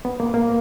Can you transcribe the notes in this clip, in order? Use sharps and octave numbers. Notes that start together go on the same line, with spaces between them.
B3
A#3
A#3